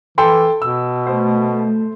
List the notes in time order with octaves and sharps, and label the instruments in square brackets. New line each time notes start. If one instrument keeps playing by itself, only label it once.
[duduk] E3 [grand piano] A4 G5 C6
[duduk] B2 [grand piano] E6
[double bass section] A3 [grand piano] C5